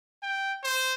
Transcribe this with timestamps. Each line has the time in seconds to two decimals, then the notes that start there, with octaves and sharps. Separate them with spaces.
0.23 G5
0.63 C5